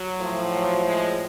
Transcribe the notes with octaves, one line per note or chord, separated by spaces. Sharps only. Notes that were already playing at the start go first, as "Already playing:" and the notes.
Already playing: F#3
A2 F3
F#3
G#3